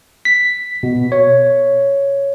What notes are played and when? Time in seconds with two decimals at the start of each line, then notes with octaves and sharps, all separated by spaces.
0.25 B6
0.83 B2
1.12 C#5